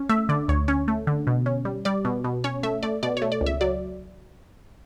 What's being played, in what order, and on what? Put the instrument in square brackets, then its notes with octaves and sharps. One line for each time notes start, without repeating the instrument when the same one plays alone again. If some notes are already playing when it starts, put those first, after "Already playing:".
Already playing: [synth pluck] C#4
A3 E5
D3 D5
D2 C#5
C#4 C#5
A3
D3
B2
C#4
G3
G3 D5
B2
B2
C#4 C#5
A3 E5
A3 D5
B2 D5
C#5
A3
D5
C#2
E5
F#3 D5